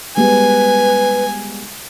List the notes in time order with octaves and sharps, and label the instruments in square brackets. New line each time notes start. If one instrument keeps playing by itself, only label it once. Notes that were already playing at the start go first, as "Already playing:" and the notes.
[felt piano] G3 G#3 B3 [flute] B4 [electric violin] G#5